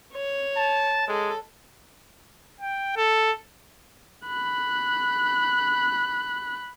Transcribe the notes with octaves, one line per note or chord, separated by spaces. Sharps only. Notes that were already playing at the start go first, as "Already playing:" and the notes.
C#5
A5
G#3 A4
G5
A4
B5 F#6